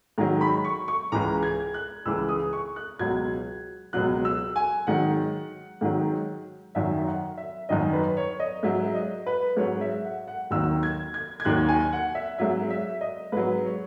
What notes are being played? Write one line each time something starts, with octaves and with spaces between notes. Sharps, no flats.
G#2 D#3 F#3 A#5
B5
C#6
C#6
C#2 C#3 E3 A#5
G#6
F#6
C#2 C#3 E3 E6
D#6
C#6
F#6
C#2 B2 F#3 G#6
C#2 B2 F#3 F#6
E6
G#5
G#2 D#3 F#3 F#5
G#2 D#3 F#3
F#2 D#3 F#3 E5
F#5
E5
F#2 D#3 F#3 D#5
B4
C#5
D#5
G#2 F#3 E5
D#5
B4
G#2 F#3 C#5
E5
F#5
F#5
D#2 D#3 F#3 E6
G#6
G#6
G#6
D#2 D#3 F#3 F#6
G#5
F#5
E5
G#2 F#3 E5
E5
D#5
G#2 F#3 B4
C#5